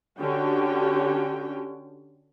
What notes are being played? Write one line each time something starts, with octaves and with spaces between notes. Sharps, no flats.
D3 C#4 F#4 G4 G5